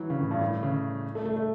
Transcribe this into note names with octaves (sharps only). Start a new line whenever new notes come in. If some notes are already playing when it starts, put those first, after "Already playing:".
Already playing: E3 F#3
C#3
A2
G2
A2
C#3
A3
A3
A3